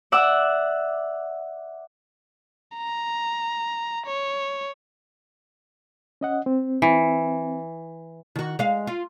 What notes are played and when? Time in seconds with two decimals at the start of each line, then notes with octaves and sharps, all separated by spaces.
0.12 D5 E5 F#5 E6
2.78 A#5
4.06 C#5
6.21 C#4 D#5 F#5
6.46 C4
6.82 E3
8.36 D#3 F#4
8.59 G#3 F5
8.87 F4